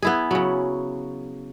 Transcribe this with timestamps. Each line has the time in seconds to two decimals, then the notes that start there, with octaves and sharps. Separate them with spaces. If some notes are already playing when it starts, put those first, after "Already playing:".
0.02 B3 E4 G#4
0.31 C#3 F#3